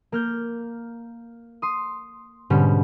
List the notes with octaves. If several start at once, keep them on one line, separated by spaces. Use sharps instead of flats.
A#3 F6 G6
C6 D#6
G#2 B2 D3 G3 C#4